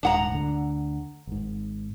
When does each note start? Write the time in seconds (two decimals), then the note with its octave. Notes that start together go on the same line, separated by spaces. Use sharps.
0.03 D#1 G#2 D4 F#5 A#5
0.31 D2 D3
1.27 G#1 G#2